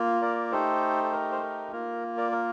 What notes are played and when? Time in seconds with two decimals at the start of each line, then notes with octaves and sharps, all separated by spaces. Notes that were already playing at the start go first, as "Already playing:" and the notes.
Already playing: A#3 F4
0.22 A#4 D5
0.52 A3 D#4 G4 A4 C5
1.04 A4
1.12 A#4
1.32 C5
1.42 A#4
1.72 A#3 F4 A#4
2.17 A#4 D5
2.32 A#4